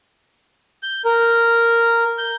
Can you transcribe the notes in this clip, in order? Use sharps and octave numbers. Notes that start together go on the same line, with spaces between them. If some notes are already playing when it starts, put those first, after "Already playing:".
G6
A#4
G6